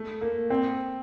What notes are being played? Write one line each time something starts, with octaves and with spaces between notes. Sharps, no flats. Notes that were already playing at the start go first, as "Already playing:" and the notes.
Already playing: A3
A#3
C4